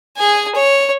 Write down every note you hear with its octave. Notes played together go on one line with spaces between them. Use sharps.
G#4 G#5
C#5